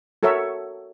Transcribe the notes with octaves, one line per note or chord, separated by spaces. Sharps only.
F#4 A4 A#4 C#5 E5